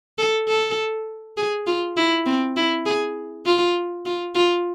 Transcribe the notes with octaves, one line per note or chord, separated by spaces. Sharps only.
A4
A4
G#4
F4
E4
C4
E4
G#4
F4
F4
F4